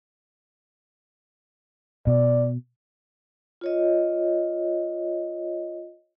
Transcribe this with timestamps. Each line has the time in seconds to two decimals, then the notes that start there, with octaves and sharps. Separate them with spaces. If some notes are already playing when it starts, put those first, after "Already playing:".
2.07 B2 D5
3.61 F4 C#5 D#5